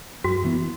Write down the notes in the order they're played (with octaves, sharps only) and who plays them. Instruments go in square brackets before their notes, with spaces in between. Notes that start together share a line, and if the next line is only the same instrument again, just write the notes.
[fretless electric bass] F#2 [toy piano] F#4
[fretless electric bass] E3 B3